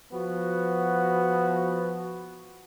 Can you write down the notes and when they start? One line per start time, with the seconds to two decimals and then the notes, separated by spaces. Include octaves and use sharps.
0.12 F3 B3 F#4